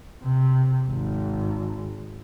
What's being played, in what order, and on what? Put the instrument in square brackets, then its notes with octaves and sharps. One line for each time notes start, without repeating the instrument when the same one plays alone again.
[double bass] C3
G#1